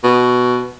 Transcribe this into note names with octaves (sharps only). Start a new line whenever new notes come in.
B2